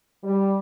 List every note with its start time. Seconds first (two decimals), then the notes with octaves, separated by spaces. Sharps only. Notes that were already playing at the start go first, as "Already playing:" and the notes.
0.24 G3